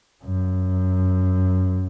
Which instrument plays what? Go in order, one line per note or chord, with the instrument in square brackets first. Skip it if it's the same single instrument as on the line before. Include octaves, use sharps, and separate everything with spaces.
[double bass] F#2